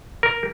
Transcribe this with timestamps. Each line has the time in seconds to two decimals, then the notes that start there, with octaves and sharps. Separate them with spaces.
0.23 A#4